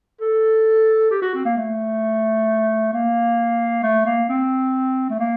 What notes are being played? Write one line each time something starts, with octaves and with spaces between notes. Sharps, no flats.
A4
G4
F#4
C4
A#3
A3
A#3
A3
A#3
C4
A3
A#3